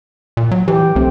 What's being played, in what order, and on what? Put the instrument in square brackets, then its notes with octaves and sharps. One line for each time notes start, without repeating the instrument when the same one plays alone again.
[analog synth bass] A#2
F#3
[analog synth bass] E3 [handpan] G4
[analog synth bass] B1 [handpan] A3 C4